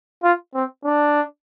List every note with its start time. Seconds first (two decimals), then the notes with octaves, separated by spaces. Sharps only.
0.23 F4
0.54 C4
0.85 D4